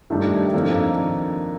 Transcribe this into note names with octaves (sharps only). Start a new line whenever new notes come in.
G2 D#3 A3 D4 G4
F2 D#3 A#3 D4 A4